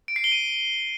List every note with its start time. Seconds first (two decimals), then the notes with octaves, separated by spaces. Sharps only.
0.08 D7
0.16 C7
0.24 G7
0.32 D#7